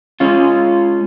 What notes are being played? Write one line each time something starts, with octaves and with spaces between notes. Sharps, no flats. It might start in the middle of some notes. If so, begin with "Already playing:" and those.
G#3 C#4 F4